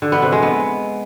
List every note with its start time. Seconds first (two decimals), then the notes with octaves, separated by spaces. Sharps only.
0.02 D3
0.12 B3
0.22 C3
0.32 G#3
0.42 B3